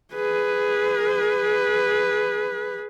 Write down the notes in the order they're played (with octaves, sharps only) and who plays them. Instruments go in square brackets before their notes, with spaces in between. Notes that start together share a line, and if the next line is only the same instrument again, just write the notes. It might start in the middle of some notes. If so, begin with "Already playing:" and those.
[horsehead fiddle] G#4 B4